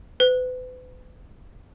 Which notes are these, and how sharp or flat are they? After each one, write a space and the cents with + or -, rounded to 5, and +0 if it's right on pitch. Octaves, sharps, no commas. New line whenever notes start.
B4 +40